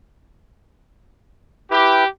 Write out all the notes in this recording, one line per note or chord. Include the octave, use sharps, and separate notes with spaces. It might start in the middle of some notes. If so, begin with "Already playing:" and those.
E4 G4 B4